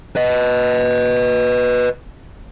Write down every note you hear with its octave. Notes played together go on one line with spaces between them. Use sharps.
B4 D#5